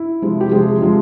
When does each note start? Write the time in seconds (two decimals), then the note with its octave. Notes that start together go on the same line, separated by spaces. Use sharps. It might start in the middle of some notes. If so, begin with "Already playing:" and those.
Already playing: E4
0.22 C3 F3 G#3
0.41 G4
0.51 C3 F3 G#3 G#4
0.81 C3 F3 G#3